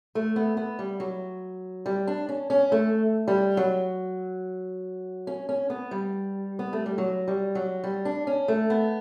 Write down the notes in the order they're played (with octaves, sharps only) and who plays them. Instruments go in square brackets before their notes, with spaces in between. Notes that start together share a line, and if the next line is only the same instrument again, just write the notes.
[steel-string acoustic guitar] A3
B3
B3
G3
F#3
G3
D4
C#4
C#4
A3
G3
F#3
C#4
C#4
B3
G3
B3
A3
G3
F#3
G3
F#3
G3
D4
C#4
A3
B3